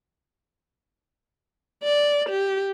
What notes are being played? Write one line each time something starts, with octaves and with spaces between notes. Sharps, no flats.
D5
G4